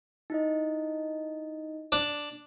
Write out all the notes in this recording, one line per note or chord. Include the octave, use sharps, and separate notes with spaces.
D#4 E4 D#5
D4